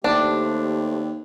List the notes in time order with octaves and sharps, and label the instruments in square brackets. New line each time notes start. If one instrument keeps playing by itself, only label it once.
[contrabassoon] D#2 [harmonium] A3 C4 G4 [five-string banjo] D4